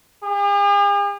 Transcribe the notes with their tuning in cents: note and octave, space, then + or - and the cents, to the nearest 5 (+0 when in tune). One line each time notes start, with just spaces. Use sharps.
G#4 -45